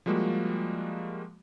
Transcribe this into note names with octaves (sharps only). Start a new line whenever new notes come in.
F3 G3 G#3 A#3 F#4